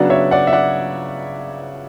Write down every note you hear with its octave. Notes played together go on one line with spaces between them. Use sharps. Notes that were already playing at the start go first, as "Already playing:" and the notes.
Already playing: C#3 F#3 B3 D4 D5 F#5
C#5 E5
D5 F#5
E5
D5 F#5